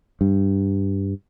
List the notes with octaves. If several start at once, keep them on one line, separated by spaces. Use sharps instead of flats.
G2